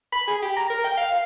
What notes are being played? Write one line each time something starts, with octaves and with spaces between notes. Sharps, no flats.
B5
G#4
G4
A#5
A#4
G5
F5
F5